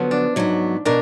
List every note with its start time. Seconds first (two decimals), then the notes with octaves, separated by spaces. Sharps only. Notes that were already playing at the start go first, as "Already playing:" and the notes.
Already playing: D3 F3 F#3 B3
0.11 D4
0.36 G#2 F#3 B3
0.85 B2 D4 A#4